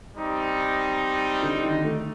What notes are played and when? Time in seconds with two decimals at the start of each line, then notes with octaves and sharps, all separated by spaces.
0.16 G3 C4 D#4
1.43 D3
1.64 D#3
1.85 A3